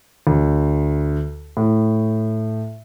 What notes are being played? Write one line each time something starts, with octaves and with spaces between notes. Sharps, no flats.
D2
A2